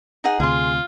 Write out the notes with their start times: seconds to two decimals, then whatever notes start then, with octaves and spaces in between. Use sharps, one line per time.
0.24 D#4 G#4 F#5
0.40 D2 C3 F4 G#4 C6